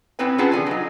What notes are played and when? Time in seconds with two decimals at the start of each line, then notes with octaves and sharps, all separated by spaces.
0.19 B2 B3 C4 E4 B4 G#5
0.38 C#4 F4 G#4 B4 F#5 A5
0.52 D3 F3 G#5
0.67 F#3 D#4